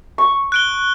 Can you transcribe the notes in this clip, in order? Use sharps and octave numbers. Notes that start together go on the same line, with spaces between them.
C#6
F#6 D7 G7